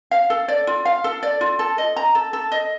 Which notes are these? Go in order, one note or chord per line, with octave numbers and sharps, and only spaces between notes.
F5
A4
D5
F4
F5
A4
D5
F4
A4
D#5
A#5
A4
A4
D#5